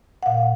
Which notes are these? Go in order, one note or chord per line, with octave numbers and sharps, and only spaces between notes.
F#5
A#2 F5